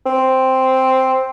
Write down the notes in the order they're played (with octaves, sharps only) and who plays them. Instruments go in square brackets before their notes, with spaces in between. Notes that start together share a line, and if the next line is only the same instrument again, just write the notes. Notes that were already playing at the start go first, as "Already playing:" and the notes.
[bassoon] C4